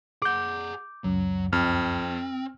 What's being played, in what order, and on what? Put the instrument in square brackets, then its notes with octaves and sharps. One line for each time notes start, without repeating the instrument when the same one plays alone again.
[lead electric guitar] G#4 F#5 [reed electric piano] D6 G6
[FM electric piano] C#2 F#2 [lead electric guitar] F#3
[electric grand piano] F2 [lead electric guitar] C4 [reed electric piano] F6